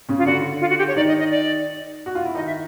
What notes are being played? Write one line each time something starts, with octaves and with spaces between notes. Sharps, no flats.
C#3 C#4
F4
D3 D4 F#4
F4
F#4
G4
C#5
D#3 D#4 D5
D#5
D#5
D5
F#4
F4
E4
D#3 D#4 D#5
E5